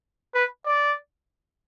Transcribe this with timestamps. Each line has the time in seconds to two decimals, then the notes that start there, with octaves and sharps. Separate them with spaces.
0.34 B4
0.66 D5